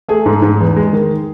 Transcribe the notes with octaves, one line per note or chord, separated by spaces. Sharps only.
A3 G#4
G#2
G#2
E2
G#3
D#3